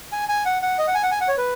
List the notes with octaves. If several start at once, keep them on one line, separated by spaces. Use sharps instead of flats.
G#5
G#5
F#5
F#5
D#5
F#5
G#5
F#5
G#5
F#5
C#5
B4